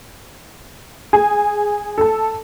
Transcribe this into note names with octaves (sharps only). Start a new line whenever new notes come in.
G#4 G#5
A4 A5